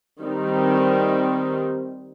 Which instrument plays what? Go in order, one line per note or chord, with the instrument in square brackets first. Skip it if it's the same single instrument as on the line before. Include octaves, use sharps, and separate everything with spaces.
[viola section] D#3 G3 C4 D#4